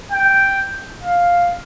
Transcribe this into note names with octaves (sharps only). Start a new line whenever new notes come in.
G5
F5